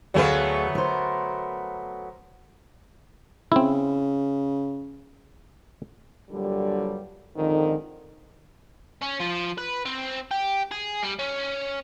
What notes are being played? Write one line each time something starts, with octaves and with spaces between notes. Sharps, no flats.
D2 F#3 A3 B3 G#4 F5
A#4 C5
C#3 C4 E4
G2 A#2 D3 F#3 G3
F2 G#2 D3 D#3
C#4
F3
B4
C4
G4
G#4
G3
C#4